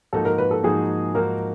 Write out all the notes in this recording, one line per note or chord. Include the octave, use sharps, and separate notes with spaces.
G#2 F3 A#3 D#4 F#4 A4
A#4
B4
A4
G#2 F3 A#3 D#4 F#4 G#4
G#2 F3 A#3 D#4 F#4 A#4